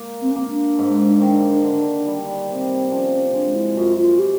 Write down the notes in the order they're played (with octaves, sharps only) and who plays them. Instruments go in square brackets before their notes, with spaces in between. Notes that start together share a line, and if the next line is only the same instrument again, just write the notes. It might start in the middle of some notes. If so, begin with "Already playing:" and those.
Already playing: [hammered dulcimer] A#3
[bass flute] C4
C#4
[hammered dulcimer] A#3 [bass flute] C4
[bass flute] D4
[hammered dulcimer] G#2
D#3
D3
G3
[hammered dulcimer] C3 [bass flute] C4
[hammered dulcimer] F3 [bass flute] C#4
[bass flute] C#4
[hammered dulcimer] G#3 [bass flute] D4
[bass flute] E4
[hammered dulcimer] F#2 [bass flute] F4
[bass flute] F4
G4